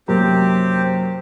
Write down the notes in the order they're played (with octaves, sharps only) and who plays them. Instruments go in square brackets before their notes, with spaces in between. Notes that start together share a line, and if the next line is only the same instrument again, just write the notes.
[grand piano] F#2 C3 A#3 [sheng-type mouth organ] C4 G4